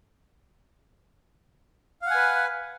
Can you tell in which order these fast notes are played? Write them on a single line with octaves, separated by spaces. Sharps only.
F5 F#5 G#5 B4